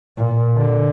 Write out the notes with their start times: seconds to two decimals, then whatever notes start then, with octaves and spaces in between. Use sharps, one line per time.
0.17 A#2
0.57 D3